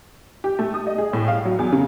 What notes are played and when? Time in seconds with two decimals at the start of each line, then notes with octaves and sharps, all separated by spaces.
0.44 G4
0.59 A3
0.74 D#6
0.87 D#5
0.98 G#4
1.13 A2
1.28 F5
1.45 F#3
1.59 E2
1.72 C#3